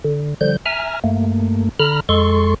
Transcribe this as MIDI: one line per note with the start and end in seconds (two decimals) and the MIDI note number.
0.04 0.34 50
0.41 0.57 50
0.41 0.57 53
0.41 0.57 55
0.41 0.57 91
0.66 1.00 76
0.66 1.00 80
0.66 1.00 82
0.66 1.00 89
1.04 1.69 43
1.04 1.69 57
1.04 1.69 58
1.80 2.00 50
1.80 2.00 82
1.80 2.00 83
1.80 2.00 89
2.09 2.54 41
2.09 2.54 56
2.09 2.54 69
2.09 2.54 84
2.09 2.54 85